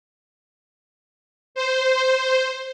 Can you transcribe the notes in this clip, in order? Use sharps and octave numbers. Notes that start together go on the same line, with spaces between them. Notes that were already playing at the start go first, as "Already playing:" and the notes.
C5